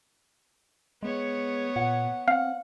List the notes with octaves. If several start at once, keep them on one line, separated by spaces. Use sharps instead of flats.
G#3 B3 C#5
A#2 F#5
C4 F5 F#5